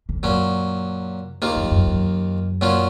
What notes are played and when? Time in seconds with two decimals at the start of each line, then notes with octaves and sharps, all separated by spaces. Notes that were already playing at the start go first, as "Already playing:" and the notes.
0.09 C#3
0.23 F#2 A#2 F#3 C#4
1.42 D#2 D#3 A#3 F4
1.56 F#2
1.71 F#2
1.87 F#2
2.61 A#2 F#3 C#4 F4